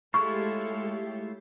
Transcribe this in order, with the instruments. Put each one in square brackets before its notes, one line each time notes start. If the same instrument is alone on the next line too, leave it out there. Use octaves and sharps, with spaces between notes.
[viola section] G#3 A4 C#5 [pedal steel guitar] A3 E4 F4 [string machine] G4 [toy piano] C#6